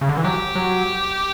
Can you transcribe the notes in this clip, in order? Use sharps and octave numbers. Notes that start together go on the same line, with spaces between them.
C#3
D3
E3
F#3 G4
F#3